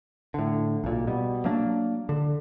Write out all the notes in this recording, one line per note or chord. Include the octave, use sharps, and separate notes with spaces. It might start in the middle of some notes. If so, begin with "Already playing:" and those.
A2 D3
B1 A#2
B2 G3
F#3 A#3 D4
D3